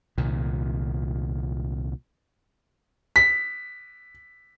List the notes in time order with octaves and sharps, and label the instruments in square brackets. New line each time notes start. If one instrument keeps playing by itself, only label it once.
[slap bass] C2 A#2 D#3
[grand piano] B6